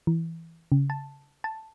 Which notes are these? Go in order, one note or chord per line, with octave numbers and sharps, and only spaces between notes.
E3
C#3
A5
A5